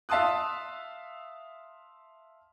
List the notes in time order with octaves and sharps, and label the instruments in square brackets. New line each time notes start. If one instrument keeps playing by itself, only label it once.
[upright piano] E5 F5 A5 C6 D#6 F#6